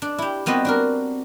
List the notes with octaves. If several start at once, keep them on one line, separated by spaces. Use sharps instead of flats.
D4
E4 G4
G3 B3 C4 F#4 D#5
D4 F#4 A#4